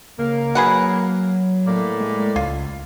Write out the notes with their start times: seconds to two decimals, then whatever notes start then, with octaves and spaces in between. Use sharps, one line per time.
0.19 C#2 A#3
0.55 F#3 G#4 B4 F#5
1.65 A2 A#3 D5
2.00 G#3
2.36 C#2 F4